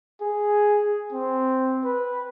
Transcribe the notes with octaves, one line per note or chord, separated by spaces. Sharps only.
G#4
C4
B4